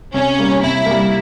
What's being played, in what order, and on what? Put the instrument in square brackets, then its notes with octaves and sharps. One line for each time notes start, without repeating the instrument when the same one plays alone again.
[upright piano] C3 [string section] C#4
[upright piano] G3 A#3
[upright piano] C3 [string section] E4
[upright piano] G3 A#3